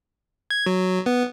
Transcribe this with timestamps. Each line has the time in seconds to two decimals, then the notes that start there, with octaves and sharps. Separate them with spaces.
0.50 G#6
0.66 F#3
1.06 B3